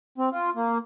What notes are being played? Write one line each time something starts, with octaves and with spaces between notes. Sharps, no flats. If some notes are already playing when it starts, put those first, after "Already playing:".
C4
F4
A#3